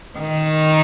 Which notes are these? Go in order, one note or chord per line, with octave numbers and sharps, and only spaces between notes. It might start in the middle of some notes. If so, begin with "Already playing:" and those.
D#3